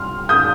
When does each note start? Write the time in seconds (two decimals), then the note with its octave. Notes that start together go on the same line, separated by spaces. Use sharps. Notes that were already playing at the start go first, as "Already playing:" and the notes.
Already playing: C2 C3 C6 F6
0.29 D#6 G6